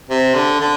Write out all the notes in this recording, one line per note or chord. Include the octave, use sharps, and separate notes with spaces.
C3
D3
D3